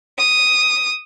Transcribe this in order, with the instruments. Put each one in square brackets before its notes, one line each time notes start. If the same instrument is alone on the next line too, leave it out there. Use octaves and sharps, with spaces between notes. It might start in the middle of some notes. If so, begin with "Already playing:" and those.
[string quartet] D#6